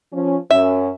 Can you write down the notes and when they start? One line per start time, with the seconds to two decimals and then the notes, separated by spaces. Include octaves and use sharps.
0.12 F3 C#4
0.51 F#2 C#4 E5